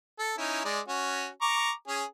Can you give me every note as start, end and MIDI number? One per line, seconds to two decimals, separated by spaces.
0.19 0.34 69
0.38 0.62 61
0.38 0.62 63
0.38 0.62 64
0.65 0.80 56
0.65 0.80 74
0.88 1.28 61
0.88 1.28 66
1.41 1.71 82
1.41 1.71 85
1.41 1.71 86
1.88 2.04 61
1.88 2.04 68